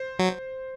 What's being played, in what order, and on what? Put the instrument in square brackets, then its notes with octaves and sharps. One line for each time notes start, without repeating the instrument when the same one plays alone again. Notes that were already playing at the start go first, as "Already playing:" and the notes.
Already playing: [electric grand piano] C5
[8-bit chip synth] F#3